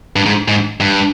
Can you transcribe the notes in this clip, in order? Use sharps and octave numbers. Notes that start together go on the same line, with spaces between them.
G2
G#2
G#2
G2